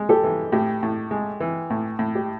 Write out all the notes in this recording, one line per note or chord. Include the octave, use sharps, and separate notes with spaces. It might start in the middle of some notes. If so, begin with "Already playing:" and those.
Already playing: G#3
G4 A4
E3
A2 G4
A2
G#3
E3
A2
A2
G4